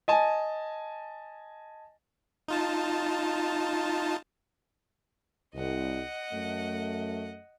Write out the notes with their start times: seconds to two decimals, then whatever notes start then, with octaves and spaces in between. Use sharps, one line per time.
0.08 D#5 G#5 A5
2.48 D#4 F4 A5
5.55 C2 D#5 F#5
6.33 F#2 A3